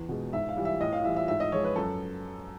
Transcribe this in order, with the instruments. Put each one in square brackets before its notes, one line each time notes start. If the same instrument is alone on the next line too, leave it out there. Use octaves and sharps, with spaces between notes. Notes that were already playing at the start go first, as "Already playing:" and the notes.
Already playing: [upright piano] E2
B2 G#3
G#2 E5
F5
E3 G3
E5
A2 D#5
F5
E3 G3 E5
E5
G#2 E5
D#5
F3 G#3 C#5
B4
F#2 A4